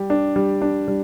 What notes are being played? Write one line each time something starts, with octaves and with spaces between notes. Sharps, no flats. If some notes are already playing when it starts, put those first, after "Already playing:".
Already playing: G3 G4
D4
G3
D4
G3